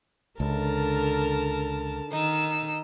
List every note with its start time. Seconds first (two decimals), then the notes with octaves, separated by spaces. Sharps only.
0.40 C#2 D3 A#4 A5
2.11 D#3 D#4 E6